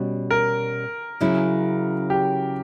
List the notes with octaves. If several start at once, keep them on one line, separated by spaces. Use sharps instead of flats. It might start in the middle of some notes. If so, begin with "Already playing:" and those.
Already playing: B2 G3 C#4 F#4
A#4
C#3 F#3 C#4 E4
G4